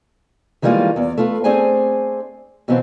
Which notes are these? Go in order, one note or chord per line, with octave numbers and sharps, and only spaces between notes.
D#3 E3 G3 G#3 A#3 F4
E2 D5
A3 F4 B4
A3 C4 D4 G#4 C5 G#5
B2 E3 F#3 B3 C4 F4